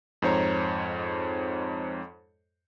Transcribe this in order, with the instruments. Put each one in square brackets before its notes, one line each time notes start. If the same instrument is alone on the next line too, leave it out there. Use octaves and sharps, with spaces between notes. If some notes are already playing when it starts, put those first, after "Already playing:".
[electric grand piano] F2 G#2 C5 C#5 A#5